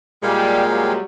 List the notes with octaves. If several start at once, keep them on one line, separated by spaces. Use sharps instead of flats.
A#2 G3 G#3 F5 G5 G#5
F#2 F#3 G3